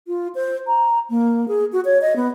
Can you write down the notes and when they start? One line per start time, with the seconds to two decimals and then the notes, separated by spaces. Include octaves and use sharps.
0.08 F4
0.35 C5
0.67 A#5
1.10 A#3
1.48 G#4
1.72 F#4
1.85 C#5
2.01 D#5
2.16 B3